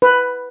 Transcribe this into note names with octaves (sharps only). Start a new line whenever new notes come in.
B4